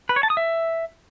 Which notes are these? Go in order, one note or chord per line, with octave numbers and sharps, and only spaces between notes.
B4
C#5
A5
D#6
E5